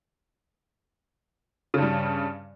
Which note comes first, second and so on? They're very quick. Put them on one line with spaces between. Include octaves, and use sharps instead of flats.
C#3 G2 G3